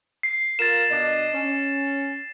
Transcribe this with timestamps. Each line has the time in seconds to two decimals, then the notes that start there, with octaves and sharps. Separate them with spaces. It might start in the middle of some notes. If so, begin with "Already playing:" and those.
0.23 C7
0.59 F4 A#4 A6 E7
0.89 B2 D4 D#5
1.34 C#4